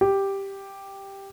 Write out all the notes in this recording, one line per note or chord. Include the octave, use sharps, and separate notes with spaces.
G4